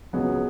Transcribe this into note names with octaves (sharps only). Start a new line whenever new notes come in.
C#2 C#3 F#3 G#3 B3